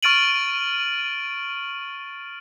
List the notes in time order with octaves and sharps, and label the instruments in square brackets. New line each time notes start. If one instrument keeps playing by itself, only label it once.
[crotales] C#6 F6 A6 D7 D#7 F#7